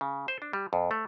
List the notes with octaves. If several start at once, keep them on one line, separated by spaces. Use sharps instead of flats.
C#3
C5
D4
G3
F2
A3